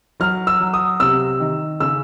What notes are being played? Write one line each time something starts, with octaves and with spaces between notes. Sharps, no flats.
F#3 F6
E6
F#3
D#6
C3 E6
D#3
C#3 E6